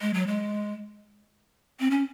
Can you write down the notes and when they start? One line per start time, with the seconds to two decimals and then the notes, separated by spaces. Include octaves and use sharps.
0.02 G#3
0.14 F#3
0.27 G#3
1.80 C4
1.91 C#4